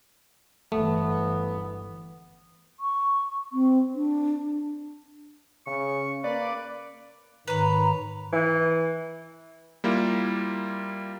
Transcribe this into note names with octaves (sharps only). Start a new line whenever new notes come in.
G1 E3 A3 B3
C#6
C4
D4
C#3 C#4 C#6
A#3 B4 D5
G#2 D#3 B4 C#5 A#5
E3
G3 A#3 E4 F4